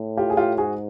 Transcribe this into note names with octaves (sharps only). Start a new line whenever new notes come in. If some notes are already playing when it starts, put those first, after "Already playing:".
Already playing: A2
F4 G4
G#4
F4 G4
G#2 F#4 G#4